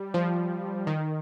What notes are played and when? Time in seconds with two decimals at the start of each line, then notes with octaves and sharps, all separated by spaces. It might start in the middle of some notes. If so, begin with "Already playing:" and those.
Already playing: G3
0.14 F3
0.87 D#3